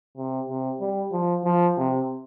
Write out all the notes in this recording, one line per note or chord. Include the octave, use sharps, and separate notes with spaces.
C3
C3
G3
F3
F3
C3